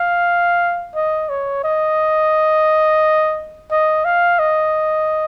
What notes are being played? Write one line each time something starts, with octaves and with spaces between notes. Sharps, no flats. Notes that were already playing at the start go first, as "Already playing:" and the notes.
Already playing: F5
D#5
C#5
D#5
D#5
F5
D#5